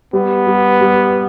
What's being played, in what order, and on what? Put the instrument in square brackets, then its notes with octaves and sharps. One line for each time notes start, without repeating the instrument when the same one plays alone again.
[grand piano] G3 [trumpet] B3
[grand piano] G3
G3